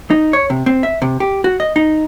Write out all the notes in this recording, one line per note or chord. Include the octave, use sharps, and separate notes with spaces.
D#4
C#5
C3
C4
E5
C3
G4
F#4
D#5
D#4